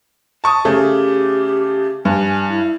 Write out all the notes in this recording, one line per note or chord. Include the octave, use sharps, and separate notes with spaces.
A5 C#6 D#6
C#3 A3 G4 G#4
G2 G#5
E4